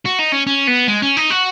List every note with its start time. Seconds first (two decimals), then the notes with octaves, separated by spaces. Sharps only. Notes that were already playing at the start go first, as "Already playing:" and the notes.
0.05 F#4
0.19 D#4
0.32 C#4
0.47 C#4
0.67 B3
0.88 G#3
1.02 C#4
1.17 D#4
1.30 F#4